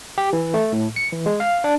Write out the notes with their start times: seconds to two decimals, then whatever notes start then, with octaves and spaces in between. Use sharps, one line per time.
0.18 G4
0.33 E3
0.54 A3
0.72 A2
0.96 C#7
1.12 E3
1.26 G#3
1.40 F5
1.64 D4